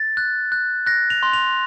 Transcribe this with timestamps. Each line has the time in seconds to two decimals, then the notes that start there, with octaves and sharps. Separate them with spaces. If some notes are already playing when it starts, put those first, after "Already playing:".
Already playing: A6
0.17 F#6
0.52 F#6
0.86 F#6 A#6
1.10 F7
1.23 C6
1.33 F7